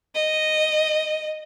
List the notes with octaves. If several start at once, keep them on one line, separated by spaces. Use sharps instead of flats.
D#5